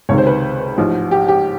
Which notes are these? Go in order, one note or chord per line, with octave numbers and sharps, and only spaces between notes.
C#2 C3 D#3 C#5
C5
B4
A1 G#2 F3
G4
G4